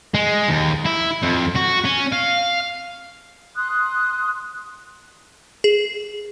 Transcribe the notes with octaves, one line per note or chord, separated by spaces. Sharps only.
G#3
D#2
E4
F2
F#4
C#4
F5
C6 D#6 F#6
G#4